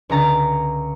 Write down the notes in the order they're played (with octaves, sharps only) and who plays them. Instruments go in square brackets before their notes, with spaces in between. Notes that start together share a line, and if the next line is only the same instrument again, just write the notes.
[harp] C#2 D3 A#5 A6